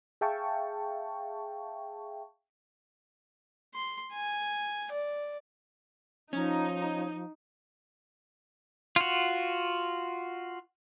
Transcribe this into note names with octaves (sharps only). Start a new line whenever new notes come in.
G#4 E5 F5 G5 A5 C#6
C6
G#5
D5
F3 C#4 D#4
F4 F#4